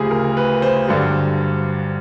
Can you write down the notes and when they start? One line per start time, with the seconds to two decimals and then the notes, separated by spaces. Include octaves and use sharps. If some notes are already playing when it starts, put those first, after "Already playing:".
Already playing: D2 C#3 F3 G4 G#4
0.11 A#4
0.37 B4
0.62 C5
0.88 G2 D3 F#3